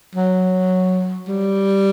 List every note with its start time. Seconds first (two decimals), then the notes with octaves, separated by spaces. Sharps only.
0.16 F#3
1.28 G3